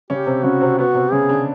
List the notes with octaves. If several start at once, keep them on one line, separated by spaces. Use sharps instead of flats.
C#3 C#4 G4
C3 C4
C#3 C#4 F#4
C3 C4
B3 F#4
C3 C4
C#3 C#4 G#4
D3 D4